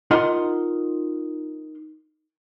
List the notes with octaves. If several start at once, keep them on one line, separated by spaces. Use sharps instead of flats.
D#4 F4 A#4 D#5 F#5 C6